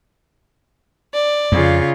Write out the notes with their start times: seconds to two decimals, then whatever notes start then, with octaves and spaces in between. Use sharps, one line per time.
1.14 D5
1.52 F2 C#3 F4